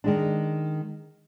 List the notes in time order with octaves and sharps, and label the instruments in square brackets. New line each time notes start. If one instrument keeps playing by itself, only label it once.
[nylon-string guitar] D#3 G#3 D4